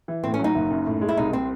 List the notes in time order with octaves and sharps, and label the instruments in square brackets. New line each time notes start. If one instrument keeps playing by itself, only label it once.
[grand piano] E3
[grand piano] A2 [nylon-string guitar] C4
[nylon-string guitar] C#4
[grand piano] F#3 [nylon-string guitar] D#4
[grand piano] F#1
F#2
A2
G#3
[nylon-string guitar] E4
[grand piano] C2 [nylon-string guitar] D#4
[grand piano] C3 [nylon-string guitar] C4